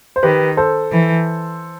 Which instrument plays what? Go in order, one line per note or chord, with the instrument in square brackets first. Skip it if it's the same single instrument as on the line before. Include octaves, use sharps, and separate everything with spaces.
[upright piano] C5
[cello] D#3 [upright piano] G4 B4
[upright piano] A4 C5
[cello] E3